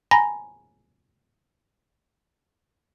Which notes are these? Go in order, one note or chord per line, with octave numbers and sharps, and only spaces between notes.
G#5 A#5 B5 A#6